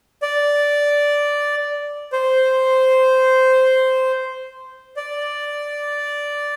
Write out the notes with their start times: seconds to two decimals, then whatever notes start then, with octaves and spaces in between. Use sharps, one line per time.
0.22 D5
2.12 C5
4.97 D5